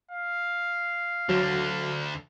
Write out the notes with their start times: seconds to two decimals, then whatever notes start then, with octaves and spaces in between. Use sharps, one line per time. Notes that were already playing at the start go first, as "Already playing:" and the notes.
0.11 F5
1.29 D2 D3 F#3